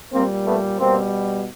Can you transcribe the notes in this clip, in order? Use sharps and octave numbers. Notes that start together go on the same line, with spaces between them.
A#2 G3 A#3 C4
A3 B3
B2 G3 A#3 C4